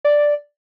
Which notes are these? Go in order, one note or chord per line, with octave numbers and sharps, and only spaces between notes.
D5